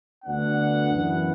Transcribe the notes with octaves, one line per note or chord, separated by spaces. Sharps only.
D2 D3 B3 D4 F#5
F#2 E3 B3